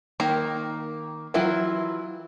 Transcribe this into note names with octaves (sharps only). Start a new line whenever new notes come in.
D#3 A#3 A#5
E3 F#3 E4 F4